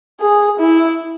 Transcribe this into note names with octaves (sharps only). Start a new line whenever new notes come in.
G#4
E4